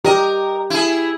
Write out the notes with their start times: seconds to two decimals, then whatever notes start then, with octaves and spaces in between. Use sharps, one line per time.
0.05 G4 A#4 D#5
0.70 E4 G#4